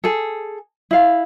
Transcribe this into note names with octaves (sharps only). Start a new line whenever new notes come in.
G#4 A4
E4 F5